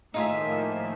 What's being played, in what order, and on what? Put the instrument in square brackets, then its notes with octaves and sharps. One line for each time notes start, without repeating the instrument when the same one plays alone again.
[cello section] A2 E5 [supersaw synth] D#3 F3 A#3 [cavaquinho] D#4 F4 G#4